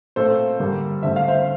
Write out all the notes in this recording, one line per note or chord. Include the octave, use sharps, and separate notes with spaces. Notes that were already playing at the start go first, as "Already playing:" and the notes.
A#2 A3 C4 A4 C5
G2 D3 G3 A#3
G2 D3 A3 C4 E5
F5
C5 E5